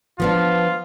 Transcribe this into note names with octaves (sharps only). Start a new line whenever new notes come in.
F3 B3 D4 F4